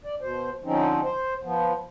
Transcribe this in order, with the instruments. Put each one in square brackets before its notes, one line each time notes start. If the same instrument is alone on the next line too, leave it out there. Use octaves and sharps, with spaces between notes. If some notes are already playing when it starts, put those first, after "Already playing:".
[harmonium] D5
B2 C5
D3 F3 C4 C#4 D#4
C5
F3 B3